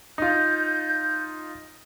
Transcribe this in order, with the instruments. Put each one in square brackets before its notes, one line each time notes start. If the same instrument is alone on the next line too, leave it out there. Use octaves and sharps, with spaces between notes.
[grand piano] D#4 F4 [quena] G6